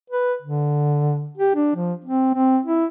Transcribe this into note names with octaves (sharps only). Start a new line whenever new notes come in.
B4
D3
G4
D4
F3
C4
C4
E4